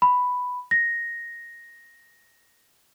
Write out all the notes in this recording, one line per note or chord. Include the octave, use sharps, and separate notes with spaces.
B5
A#6